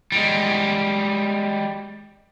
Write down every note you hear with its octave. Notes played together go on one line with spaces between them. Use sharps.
G3 G#3